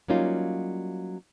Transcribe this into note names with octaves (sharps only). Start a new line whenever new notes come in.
F#3 G3 A#3 C#4 D#4 F4